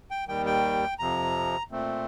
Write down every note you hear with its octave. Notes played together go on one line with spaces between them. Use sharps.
G5
D#2 D#3 G3 G5
G5
F2 C3 F3 A#5
A#2 A3 C4